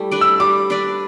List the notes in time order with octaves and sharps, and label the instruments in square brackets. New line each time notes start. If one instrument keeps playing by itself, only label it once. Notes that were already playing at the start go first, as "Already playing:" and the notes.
Already playing: [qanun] G3 A3 E4
D4 B4 D5
[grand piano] E6
[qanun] G3 [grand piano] D6
[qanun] D4 B4 D5